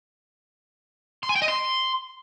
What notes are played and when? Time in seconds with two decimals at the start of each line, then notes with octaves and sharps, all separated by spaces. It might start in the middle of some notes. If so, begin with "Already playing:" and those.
1.23 C6
1.29 G#5
1.36 G5
1.42 D#5
1.48 C6